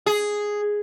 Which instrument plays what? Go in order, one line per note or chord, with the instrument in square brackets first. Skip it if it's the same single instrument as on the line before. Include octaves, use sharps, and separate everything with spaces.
[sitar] G#4